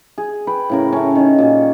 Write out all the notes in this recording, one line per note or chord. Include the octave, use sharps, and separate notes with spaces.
G#4
B4 G5
A2 C#3 A#4
A3 C#4
D#3 G#4
A#2 F#4